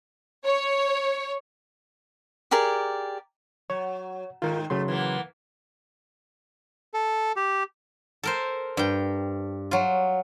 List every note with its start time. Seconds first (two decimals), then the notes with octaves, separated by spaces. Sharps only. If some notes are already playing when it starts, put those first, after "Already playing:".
0.46 C#5
2.51 G4 G#4 A#4 D5
3.70 F#3 C#5
4.42 G#2 D#3 F4 A#4
4.70 C#3 F#3 A3 C6
4.88 E3 A#3 B3
6.94 A4
7.36 G4
8.23 A4 A#4 C5
8.77 G2 G5
9.71 F#3 F4